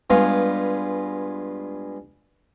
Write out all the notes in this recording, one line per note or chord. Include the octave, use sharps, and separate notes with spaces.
G2 G#3 B3 F4 F5